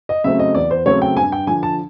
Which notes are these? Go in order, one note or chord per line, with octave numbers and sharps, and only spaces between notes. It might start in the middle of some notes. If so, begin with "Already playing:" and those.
D#5
C#3 F#3 A3 C4 E5
D#5
E2 D5
C5
C#3 F#3 A3 C4 C#5
G5
G2 G#5
G5
D3 F3 G#5
A5